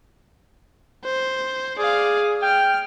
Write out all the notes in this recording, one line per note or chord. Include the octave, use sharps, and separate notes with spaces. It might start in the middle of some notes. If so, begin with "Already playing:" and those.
C5
G#4 D5 F5
G5 F6